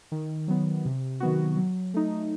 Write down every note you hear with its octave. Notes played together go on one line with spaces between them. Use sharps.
D#3
F#3 B3
C3
D#3 F#3 B3 F#4
F#3
A3 D#4